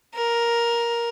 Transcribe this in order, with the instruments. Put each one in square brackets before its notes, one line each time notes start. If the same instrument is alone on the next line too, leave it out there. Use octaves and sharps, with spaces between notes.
[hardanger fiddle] A#4